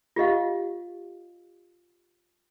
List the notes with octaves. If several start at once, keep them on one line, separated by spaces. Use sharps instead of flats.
F4 G4 D#5 F5